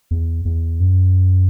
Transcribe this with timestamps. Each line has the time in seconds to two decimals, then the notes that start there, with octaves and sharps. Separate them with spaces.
0.11 E2
0.45 E2
0.80 F#2